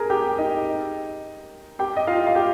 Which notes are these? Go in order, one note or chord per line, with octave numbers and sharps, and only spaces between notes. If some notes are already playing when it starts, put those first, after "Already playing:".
Already playing: G#4 A#4 G#5 A#5
G4 G5
D#4 D#5
G4 G5
D#5
F4 F5
F5
G4 G5